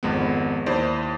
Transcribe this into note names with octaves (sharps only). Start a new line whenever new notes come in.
G#1 F2 G#3 B3
D#2 E4 C5 D5